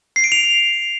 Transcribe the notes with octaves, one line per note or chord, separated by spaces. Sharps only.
C7
D7
F7